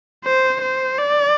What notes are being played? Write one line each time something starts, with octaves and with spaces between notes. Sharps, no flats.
C5
C5
D5